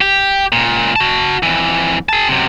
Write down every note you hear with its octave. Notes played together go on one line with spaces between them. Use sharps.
G4
C#2 A#2
F#4 A5
F2 E3
G#4 A5
F#2 C3